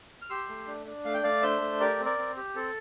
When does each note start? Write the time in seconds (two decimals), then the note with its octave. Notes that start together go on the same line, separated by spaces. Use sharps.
0.22 F6
0.29 G4 C6 E6
0.49 A3
0.67 D4
0.86 D4
1.05 A3 F5
1.14 G5
1.23 A3 D5 F5
1.42 D4 C5 E5
1.61 A3
1.80 G4 A#4 D5
1.99 C4
2.05 A#4 D5
2.18 C4
2.37 G4
2.55 C4 A4